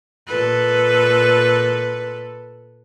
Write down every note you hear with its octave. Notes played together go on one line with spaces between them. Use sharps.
A#2 A4 B4